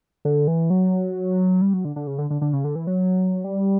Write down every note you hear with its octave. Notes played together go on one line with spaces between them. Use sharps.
D3
E3
F#3
G3
F#3
D3
D3
C#3
D3
D3
D3
C#3
D3
E3
F#3
G3